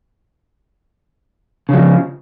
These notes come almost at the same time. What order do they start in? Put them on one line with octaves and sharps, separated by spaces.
C#3 F#3 F3